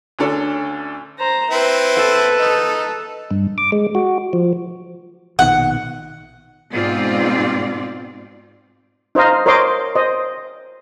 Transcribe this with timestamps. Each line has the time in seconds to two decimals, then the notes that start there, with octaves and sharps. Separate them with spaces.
0.19 D2 D3 C#4 D4 A4
1.19 C5 A#5
1.51 C4 E4 B4 C5
1.97 A4
2.39 D#4 D#5
3.31 G2
3.58 D6
3.72 G#3
3.95 F#4
4.33 F3
5.39 A#1 B2 D#3 F#5
6.73 G#2 B2 C4 F4 D5
9.15 D#4 C5 D#5 F5 A#5
9.46 A#4 C5 C#5 D#5 C6 D6
9.95 C5 D#5